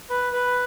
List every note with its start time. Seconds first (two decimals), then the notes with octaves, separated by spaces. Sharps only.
0.10 B4
0.33 B4